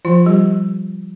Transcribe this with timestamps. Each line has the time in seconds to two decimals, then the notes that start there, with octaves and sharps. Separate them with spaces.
0.05 F3 F4
0.26 G3 G4